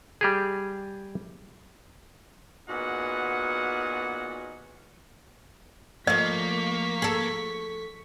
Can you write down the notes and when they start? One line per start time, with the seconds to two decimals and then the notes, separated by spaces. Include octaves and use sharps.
0.21 G3 G4 G#4
2.69 A#2 B3 D#4 F#4 G#4 F#5
6.07 F3 A3 A#3 D#5 C#6 B6
7.02 G#4 A4